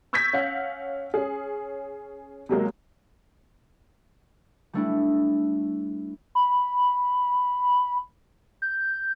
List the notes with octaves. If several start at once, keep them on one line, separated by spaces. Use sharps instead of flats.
C#6 E6 G6 G#6 A#6 B6
C#4 F5 F#5
C#4 G#4
C3 F#3 G#3 A#3
G3 A3 D4 E4
B5
G6